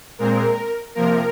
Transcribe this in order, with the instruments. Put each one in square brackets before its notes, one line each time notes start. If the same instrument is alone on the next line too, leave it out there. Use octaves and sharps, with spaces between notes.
[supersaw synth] A#2 G#3 C4 A#4
C3 F3 A#3 A#4